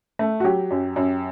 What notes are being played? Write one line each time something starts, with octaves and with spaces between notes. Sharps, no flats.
A3
F#4
F#3 G4
F#2
F#2